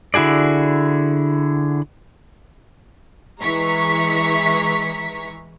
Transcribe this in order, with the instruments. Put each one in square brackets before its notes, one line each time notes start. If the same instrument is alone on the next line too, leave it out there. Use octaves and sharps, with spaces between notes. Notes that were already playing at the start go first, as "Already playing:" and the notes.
[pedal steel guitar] D3 E4 F#4 G#4 D5
[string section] E3 G#3 A#5 C#6 B6